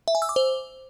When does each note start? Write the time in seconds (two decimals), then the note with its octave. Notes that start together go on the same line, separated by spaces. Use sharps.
0.08 E5
0.15 G#5
0.22 E6
0.29 D6
0.36 C5